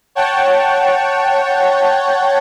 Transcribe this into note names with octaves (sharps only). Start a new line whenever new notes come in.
C#5 F#5 G5 A5